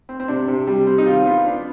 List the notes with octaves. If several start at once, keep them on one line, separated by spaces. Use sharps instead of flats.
C4
C4
C3 D4
C3
G3
C4
D#4
D#3 F4
B3 F4
B3 D4